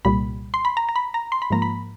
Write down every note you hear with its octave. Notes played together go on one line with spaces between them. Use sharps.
C2 A#2 G3 B5
C6
B5
A#5
A#5
B5
A#5
C6
B5
G#2 F3 A#3 A#5
B5